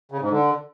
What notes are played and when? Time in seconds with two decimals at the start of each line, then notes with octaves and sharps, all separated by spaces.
0.12 C#3
0.21 G#2
0.31 D3